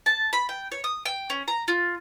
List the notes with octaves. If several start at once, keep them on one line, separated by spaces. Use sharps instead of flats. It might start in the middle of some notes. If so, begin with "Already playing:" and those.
A5
B5
G5
C#5
D#6
G5
C#4
A#5
F4